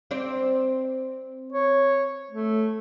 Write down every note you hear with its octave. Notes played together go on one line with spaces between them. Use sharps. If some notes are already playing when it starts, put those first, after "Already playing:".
C4 C5 D5
C#5
A3